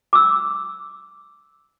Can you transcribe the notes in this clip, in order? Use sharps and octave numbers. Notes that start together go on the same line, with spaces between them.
D6 E6